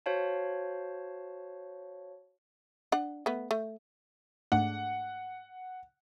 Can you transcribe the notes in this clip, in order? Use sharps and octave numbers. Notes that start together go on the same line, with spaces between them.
F#4 C5 C#5 F5 A5
D4 F#5
A3 B3
A3
G#2 A3 D4 F#5